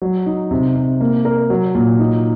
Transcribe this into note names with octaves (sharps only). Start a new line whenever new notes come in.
F#3
D#4
C3
C3
A#3
A#4
F#3
A#2
D#4